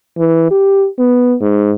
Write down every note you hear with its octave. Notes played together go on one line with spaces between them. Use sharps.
E3
G4
B3
G#2